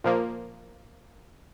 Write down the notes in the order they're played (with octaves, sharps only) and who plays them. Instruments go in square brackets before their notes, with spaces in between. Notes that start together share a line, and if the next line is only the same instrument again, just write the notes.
[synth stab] A#2 F3 A#3